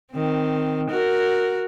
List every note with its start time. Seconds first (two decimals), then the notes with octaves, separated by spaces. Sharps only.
0.13 D#3 C4
0.90 F#4 A#4